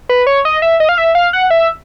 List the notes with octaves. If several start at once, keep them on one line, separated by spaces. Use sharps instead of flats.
B4
C#5
D#5
E5
D#5
F5
E5
F5
F#5
E5